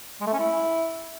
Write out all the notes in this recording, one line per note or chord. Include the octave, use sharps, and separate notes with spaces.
G#3
A3
C#4
E4